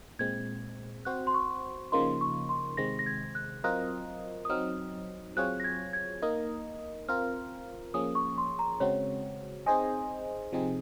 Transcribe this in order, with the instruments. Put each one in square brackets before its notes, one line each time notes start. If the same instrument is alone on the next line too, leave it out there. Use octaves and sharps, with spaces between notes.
[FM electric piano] A#2 G#3 C4 [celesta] G#6
[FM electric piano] C4 F#4 C5 [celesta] F#6
[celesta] C6
C#6
[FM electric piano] C#3 F3 A#3 D#4 [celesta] C6
[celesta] C#6
C6
[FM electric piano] C3 D#3 G#3 C4 [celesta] A#6
[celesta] A#6
G#6
F#6
[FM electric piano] F#3 C4 F4 A#4 D#5 [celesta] F#6
[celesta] D#6
[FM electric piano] F#3 C4 D#4 [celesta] F6
[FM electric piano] F#3 C4 F4 G#4 C#5 [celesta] F#6
[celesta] A#6
G#6
G#6
[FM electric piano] A#3 D#4 A#4 D#5
[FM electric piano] C4 F4 A#4 [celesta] F6
[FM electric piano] F3 A#3 C#4 G#4 [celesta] D#6
[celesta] C#6
C6
A#5
[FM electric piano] C#3 G#3 C4 F#4 [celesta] C#5
[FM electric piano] C4 D#4 G#4 C5 D#5 [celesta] G#5
[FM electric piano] C3 F3 C4 D#4 G#4